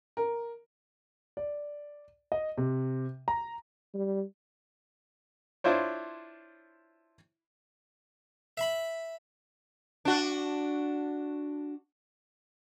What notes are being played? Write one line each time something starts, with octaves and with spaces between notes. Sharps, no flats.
A#4
D5
D#5
C3
A#5
G3
D4 E4 F4 C5 C#5
E5 B5
D4 F#4